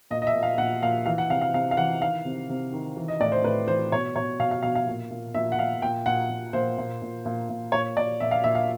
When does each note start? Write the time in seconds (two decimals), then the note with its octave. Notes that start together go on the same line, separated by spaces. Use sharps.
0.11 A#2 D#5
0.22 D#5
0.27 E5
0.34 A#2
0.43 F5
0.58 A#2 F#5
0.82 A#2 F5
1.06 E3 F5
1.18 F#5
1.30 C3 F5
1.41 F5
1.53 C3 F5
1.71 F5
1.77 E3 F#5
2.01 D#3 F5
2.25 C3
2.50 C3
2.73 D#3
2.97 E3
3.08 D#5
3.20 A2 D5
3.32 C5
3.44 A2 B4
3.67 E3 C5
3.92 B2 C#5
4.16 B2 C#5
4.40 B2 F5
4.51 F5
4.63 B2 F5
4.75 F5
4.87 A#2
5.11 A#2
5.34 A#2 E5
5.52 F#5
5.59 A#2 F5
5.82 A#2 G5
6.06 A#2 F#5
6.29 A#2
6.53 A#2 C5
6.78 A#2
7.02 A#2
7.25 A#2
7.49 A#2
7.72 A#2 C#5
7.96 A#2 D5
8.20 A#2 E5
8.31 F5
8.44 A#2 E5
8.55 F5